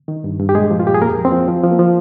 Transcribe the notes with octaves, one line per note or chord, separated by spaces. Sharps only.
D#3
G2
G2
G4
A#2 G#3 G#4
F3
F4
A#2 G4
G#4
F2 A#3 A#4
F3
C4
F3
F3
F3
A#3
F3